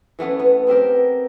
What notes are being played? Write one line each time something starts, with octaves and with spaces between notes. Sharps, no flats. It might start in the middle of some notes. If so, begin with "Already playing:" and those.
E3 A3 B3 C#4
B3
B3 C4 G4 A#4